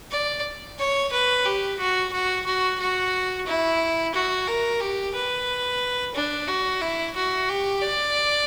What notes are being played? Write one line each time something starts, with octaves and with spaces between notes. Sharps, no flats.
D5
C#5
B4
G4
F#4
F#4
F#4
F#4
E4
F#4
A#4
G4
B4
D4
F#4
E4
F#4
G4
D5